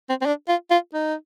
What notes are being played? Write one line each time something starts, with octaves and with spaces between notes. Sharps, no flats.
C4
C4
D4
F4
F4
D#4